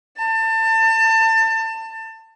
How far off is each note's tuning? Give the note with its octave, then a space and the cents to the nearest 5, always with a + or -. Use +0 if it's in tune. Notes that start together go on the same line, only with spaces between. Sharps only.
A5 +30